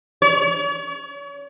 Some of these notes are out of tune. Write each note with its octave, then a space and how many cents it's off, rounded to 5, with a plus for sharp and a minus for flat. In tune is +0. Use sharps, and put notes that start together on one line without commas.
C#5 +40